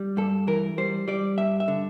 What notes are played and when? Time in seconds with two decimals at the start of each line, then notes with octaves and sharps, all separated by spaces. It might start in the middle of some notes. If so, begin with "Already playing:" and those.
Already playing: G3
0.17 G2 A4
0.47 E3 A#4
0.78 G3 C5
1.08 G3 D5
1.38 G2 E5
1.60 E5
1.68 D3